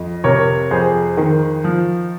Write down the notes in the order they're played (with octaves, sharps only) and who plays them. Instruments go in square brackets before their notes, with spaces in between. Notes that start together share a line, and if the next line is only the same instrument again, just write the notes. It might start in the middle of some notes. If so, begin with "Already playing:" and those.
Already playing: [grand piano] F2 D#5
C3 A#4 C#5
F2 G#4 C5
D#3
F3